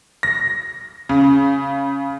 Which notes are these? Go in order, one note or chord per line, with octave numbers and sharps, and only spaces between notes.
A#6
C#3